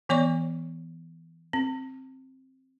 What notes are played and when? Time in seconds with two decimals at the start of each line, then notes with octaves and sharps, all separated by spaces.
0.09 E3 B3 C#5 D5 C#6
1.53 C4